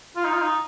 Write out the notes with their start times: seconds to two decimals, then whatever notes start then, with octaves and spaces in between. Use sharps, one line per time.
0.16 F4
0.24 D#4
0.33 F4
0.41 D#4